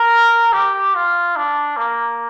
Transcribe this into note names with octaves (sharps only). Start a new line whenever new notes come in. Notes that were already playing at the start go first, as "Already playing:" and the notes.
Already playing: A#4
G4
F4
D4
A#3